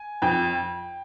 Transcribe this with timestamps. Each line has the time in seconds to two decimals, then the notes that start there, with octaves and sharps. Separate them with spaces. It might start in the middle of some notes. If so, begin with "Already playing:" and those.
Already playing: G#5
0.22 F2 G5